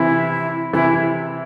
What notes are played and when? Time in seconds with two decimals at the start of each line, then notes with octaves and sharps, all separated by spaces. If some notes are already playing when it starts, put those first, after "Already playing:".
Already playing: C3 E3 E4
0.73 C3 E3 E4